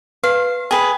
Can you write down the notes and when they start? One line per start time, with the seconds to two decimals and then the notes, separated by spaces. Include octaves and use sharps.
0.24 B4 F5
0.71 G#4 B4 G5